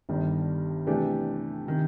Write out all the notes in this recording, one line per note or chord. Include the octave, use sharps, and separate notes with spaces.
G1 G2 D#3
C3 E3 A3 D4 G4
C3 D#3